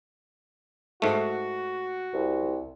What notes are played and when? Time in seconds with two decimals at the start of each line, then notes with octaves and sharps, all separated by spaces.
1.02 G#2 A3 F#4
2.14 C2